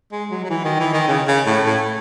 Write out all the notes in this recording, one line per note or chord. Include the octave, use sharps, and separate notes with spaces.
G#3
F#3
F#3
E3
D#3
E3
D#3
C#3
C#3
A2
A2